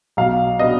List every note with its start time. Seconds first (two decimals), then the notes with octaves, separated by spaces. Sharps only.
0.17 B1 F5
0.59 B2 B3 D4 D#5